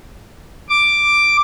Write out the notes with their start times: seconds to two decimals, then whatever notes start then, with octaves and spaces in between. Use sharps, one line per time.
0.69 D6